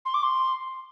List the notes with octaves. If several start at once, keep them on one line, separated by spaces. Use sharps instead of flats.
C6
D6
C6